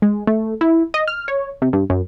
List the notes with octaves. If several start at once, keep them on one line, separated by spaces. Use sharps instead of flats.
G#3
A3
E4
D#5
F6
C#5
C3
G2
F#2